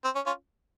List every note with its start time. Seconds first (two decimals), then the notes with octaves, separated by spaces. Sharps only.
0.04 C4
0.15 C#4
0.26 C#4 F4